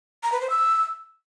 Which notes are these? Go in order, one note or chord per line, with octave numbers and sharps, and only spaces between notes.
A#5
B4
C5
E6